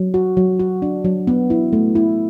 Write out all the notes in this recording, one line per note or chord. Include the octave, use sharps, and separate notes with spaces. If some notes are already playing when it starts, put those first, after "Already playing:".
Already playing: F#3
F#4
F#3
F#4
D4
F#3
B3
E4
A3
E4